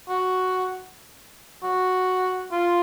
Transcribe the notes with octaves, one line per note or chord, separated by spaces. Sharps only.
F#4
F#4
F4